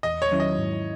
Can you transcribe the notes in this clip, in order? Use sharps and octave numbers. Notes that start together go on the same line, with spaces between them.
E2 D#5
C#5
D#3 F#3 C#4 E4
D#5
G#2